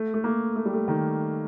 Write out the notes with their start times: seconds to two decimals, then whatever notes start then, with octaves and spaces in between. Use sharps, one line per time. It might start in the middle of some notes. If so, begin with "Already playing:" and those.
Already playing: A3
0.14 A3
0.24 A#3
0.56 A3
0.65 G3
0.74 A3
0.88 D#3